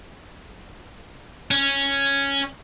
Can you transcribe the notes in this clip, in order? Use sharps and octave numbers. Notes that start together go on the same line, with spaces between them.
C#4